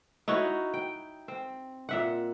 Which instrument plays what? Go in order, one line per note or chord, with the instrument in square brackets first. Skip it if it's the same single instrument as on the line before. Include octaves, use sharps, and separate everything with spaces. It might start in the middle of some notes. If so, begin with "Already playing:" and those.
[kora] D#4 E4 F#4 C#5
G5
C4
A#2 E5 F#5